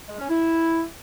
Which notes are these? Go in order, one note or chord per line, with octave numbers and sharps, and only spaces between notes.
G#3
C#4
E4